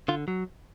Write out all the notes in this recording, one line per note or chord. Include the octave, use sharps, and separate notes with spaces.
D3 F4
F#3